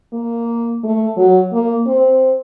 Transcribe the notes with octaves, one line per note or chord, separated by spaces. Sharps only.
A#3
A3
F#3
A#3
C4